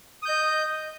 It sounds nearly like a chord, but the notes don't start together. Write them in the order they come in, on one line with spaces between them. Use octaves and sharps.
D#6 G6 D#5